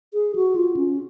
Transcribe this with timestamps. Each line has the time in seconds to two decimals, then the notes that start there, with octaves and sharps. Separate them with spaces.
0.14 G#4
0.36 F#4
0.56 F4
0.77 C#4